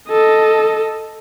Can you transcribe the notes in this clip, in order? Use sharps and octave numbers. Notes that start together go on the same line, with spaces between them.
A4 D#5